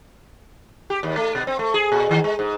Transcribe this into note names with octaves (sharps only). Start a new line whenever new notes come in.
G4
D#2
A3
B2
C4
A3
G#4
A#2
D#3
G#3
G#2